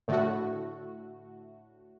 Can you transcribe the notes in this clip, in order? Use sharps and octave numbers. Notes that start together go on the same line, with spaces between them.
A2 D3 A3 F#4